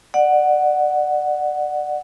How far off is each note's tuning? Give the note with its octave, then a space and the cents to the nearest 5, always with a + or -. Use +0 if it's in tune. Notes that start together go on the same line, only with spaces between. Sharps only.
D5 +25 F#5 +0